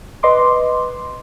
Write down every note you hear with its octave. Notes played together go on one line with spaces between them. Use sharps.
B4 D#5 C6 D6